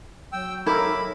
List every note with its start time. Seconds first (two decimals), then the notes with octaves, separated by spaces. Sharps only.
0.33 F#3 G5 E6
0.67 D#4 E4 A4 A#4 B5 D6